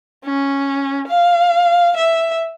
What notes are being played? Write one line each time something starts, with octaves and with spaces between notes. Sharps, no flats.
C#4
F5
E5